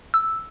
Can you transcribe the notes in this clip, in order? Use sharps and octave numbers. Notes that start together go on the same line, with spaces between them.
E6